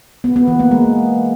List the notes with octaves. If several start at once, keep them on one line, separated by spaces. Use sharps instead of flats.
B3
B3
E3
A#3
G#3